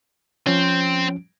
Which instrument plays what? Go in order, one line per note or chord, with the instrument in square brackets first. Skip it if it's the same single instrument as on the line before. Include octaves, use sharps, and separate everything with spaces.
[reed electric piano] F3 C#4 [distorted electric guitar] C4